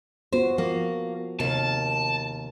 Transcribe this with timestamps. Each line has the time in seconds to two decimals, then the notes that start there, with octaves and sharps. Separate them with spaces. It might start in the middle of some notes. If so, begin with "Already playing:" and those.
0.32 B3 F4 F#4 C5
0.58 F3 A#3
1.40 D#2 C3 A#4 A5